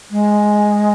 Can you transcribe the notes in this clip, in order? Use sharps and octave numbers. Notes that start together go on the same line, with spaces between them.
G#3